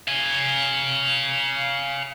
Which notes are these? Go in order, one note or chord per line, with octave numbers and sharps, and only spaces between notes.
F5 G#5